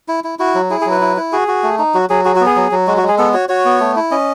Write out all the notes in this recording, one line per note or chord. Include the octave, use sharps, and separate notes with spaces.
E4
E4
E4 F#4
F#3
E4 G#4
G#4
F#3
B4
E4
E4
F#4 G#4
F#4
A3
D#4
F#3 F#4
F#3 G#4
F#4 G#4
F#4
B3
G#4
F#3
F#3
G#3 F#4
F#4
G#3
G#4
B3 A4
F#4 C#5
F#4 C#5
B3
A3
E4
C#4 D#5